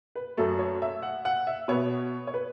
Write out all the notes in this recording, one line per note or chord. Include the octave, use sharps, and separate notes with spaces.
B4
F#2 F#3 A3 A4
C#5
E5
F#5
F#5
E5
B2 B3 C#5
C#5
B4